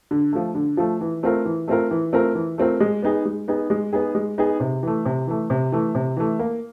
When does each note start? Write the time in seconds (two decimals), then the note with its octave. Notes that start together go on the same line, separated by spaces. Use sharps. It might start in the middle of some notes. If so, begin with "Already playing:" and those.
0.11 D3
0.32 F3 A3
0.55 D3
0.77 F3 A3
1.01 E3
1.23 A3 C4 F4 A#4
1.45 E3
1.68 A3 C4 F4 A#4
1.91 E3
2.13 A3 C4 F4 A#4
2.35 E3
2.58 A3 C4 F4 A#4
2.80 G#3
3.02 B3 D#4 G#4
3.25 G#3
3.48 B3 D#4 G#4
3.70 G#3
3.93 B3 D#4 G#4
4.15 G#3
4.38 B3 D#4 G#4
4.60 C3
4.83 E3 A3
5.05 C3
5.27 E3 A3
5.50 C3
5.72 E3 A3
5.95 C3
6.17 E3 A3
6.39 A#3